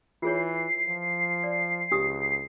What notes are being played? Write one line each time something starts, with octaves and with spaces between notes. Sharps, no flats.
E3 F4 G#4 C#5 C7
F3
D5
C#2 D4 G4 D#6